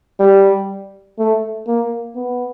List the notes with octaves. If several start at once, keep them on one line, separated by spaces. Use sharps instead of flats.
G3
A3
A#3
B3